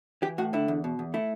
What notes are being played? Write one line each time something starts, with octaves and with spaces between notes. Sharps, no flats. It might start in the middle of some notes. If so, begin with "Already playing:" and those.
E3 G4
A2 F#4
D3 E4
E2
B2
E2
A3 E4